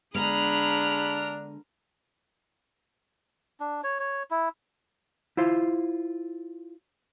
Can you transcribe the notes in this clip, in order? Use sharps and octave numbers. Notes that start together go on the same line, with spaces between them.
D3 G#3 B3 D4 G#4 A#5 B5 F6
D4
C#5
C#5
E4
E4 F4 C5